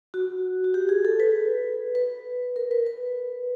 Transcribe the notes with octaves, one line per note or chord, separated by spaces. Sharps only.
F#4
F#4
G4
G#4
A4
B4
B4
A#4
B4
B4